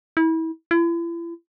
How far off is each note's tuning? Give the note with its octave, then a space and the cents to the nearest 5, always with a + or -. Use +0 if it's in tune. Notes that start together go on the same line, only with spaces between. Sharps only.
E4 -30
E4 +40